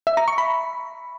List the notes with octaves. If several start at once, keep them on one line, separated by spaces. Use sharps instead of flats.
E5
A#5
C#6
B5